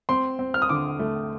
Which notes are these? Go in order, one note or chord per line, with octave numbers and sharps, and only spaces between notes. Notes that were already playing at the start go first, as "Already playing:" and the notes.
C4 C6
C4
F6
D#6
D3 D6
A3